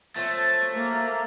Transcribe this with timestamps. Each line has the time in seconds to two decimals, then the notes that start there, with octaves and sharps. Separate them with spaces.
0.16 F3 F#3 A3 C4
0.75 A#3